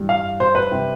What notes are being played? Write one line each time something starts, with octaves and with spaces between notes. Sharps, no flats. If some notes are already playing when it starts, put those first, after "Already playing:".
Already playing: G2 E3 G3
F5
C5
B4
C3 G3